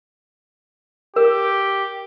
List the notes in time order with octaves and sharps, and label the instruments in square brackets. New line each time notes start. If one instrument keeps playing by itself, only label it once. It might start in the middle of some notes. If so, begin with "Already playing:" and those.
[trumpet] G4 [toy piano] A#4